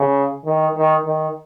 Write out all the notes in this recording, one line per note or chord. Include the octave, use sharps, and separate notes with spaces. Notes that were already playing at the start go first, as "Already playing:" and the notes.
Already playing: C#3
D#3
D#3
D#3